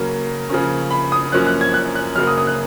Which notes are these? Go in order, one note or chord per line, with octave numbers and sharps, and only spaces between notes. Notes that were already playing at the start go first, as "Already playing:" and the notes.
Already playing: C#3 F#3 A#3 C#4
C#3 F3 A#3 C#4
B5
D#6
F#2 F3 A#3 C#4 F#6
F#6
G#6
F#6
F#6
F#2 C#3 F#3 A#3 F6
D#6
D#6
F#6